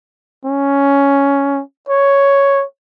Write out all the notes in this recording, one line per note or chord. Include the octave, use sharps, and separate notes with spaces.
C#4
C#5